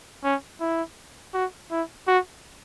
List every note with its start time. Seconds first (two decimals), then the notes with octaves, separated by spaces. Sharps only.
0.24 C#4
0.61 E4
1.34 F#4
1.71 E4
2.07 F#4